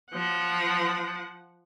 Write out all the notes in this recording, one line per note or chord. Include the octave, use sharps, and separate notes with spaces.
F3 F#5